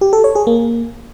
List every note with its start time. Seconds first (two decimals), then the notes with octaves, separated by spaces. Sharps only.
0.01 G4
0.13 A4
0.24 C#5
0.35 G#4
0.47 A#3